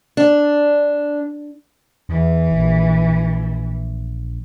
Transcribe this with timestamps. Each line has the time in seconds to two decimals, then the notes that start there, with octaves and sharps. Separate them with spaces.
0.17 D4
2.09 E2 E3
2.52 A#1